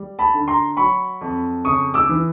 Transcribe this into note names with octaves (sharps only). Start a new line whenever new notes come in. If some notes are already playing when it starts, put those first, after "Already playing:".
Already playing: G3
A5 B5
D3
A#5 C6
F#3 B5 C#6
F2
C#3 C#6 D#6
D6 E6
E3